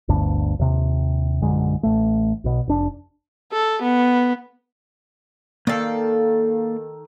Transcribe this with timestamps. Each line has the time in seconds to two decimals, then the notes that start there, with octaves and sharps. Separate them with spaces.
0.08 G1 D2 G2 D4
0.59 D#2 C3
1.42 A#1 F#2 D3 G#3
1.83 A1 A3
2.44 B1 B2
2.68 F1 D4
3.52 A4
3.83 B3
5.67 D#3 A#3 A4 D5 F5